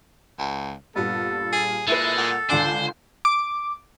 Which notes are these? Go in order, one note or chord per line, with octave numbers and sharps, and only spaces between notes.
C#2
G2 A#2 B3 A4
G#4
A#2 G#3 E4 A4 B4
A#2 F#5
C#2 D3 D4 C5 G#5
D6